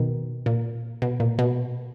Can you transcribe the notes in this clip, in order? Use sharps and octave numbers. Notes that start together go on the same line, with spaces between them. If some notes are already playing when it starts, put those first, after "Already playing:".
Already playing: B2 D#3
A#2
B2
A#2
B2